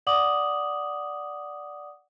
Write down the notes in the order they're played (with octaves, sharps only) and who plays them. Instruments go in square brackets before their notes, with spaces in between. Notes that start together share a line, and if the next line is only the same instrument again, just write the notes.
[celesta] D5 F#5 D6 D#6 F#7